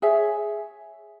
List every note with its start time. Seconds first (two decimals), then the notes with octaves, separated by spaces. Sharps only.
0.02 G#4 C#5 E5 G#5